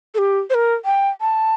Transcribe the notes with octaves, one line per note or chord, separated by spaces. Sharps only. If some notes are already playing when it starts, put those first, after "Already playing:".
A4
G4
C5
A#4
G5
A5